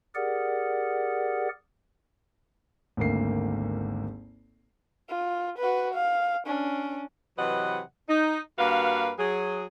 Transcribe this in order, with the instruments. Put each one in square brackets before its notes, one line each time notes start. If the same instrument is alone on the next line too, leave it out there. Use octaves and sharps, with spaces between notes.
[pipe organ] G4 G#4 A#4 D5 F#5
[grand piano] G#1 D2 A#3 C7
[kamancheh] F4
F#4 B4
F5
C#4 D4
[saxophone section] C3 E3 F#3 B4 D#5 F#5
D#4
G2 A#3 F#4 B4 F5
F#3 G#4